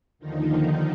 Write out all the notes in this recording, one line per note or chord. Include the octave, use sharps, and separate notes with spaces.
D#2 D3 D#3 F3 D#4